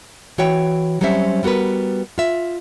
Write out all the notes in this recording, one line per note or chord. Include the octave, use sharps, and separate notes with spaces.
E3 F#4 C#5 G5
F#3 G3 C4 C#4 C5 E5
G3 B3 F#4 A#4 B4
F4 E5